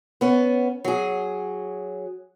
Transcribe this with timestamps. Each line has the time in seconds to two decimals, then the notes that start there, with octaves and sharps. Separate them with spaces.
0.21 B3 C#4
0.85 F#3 G#4